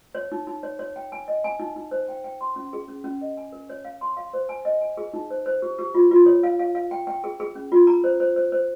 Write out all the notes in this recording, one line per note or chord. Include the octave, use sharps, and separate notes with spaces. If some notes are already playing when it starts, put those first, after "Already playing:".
C#5
D#4
D#4
C#5
C#5
G5
G#5
D#5
G#5
D#4
D#4
C5
G5
G5
C6
C#4
G#4
C#4
C#4
D#5
G#5
A#4
C#5
F5
C6
F5
C5
G#5
D#5
G#5
G#4
D#4
C5
C5
G4
G4
F4
F4
C#5
F5
F5
F5
G5
G5
G#4
G#4
C#4
F4
A#5
C5
C5
C5
C5